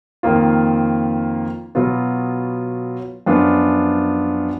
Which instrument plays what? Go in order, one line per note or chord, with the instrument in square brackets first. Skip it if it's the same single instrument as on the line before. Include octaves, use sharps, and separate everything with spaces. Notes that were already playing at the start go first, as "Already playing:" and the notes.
[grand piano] F2 D#3 A#3 F4
B2 F#3 B3 F4
F#2 F3 B3 D4 F4